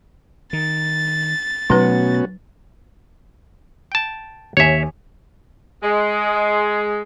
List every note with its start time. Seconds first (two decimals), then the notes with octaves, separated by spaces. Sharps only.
0.53 D#3 A6
1.70 B2 F#3 A3 B3 C#4 D#4 F#4 B4
3.92 G5 A5
4.57 D#2 C#5 E5 G#5
5.83 G#3